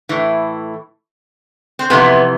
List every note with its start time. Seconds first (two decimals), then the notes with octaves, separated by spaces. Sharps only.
0.09 A2 E3
1.79 C4
1.90 F2 C3 E3 B3